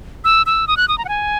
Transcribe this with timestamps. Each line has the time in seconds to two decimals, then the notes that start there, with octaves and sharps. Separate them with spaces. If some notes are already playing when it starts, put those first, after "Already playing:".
0.24 E6
0.46 E6
0.68 D#6
0.77 F#6
0.88 D#6
0.98 A#5
1.05 F#5
1.09 G#5